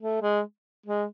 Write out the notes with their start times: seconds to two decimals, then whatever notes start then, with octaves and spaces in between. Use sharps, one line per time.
0.01 A3
0.22 G#3
0.86 G#3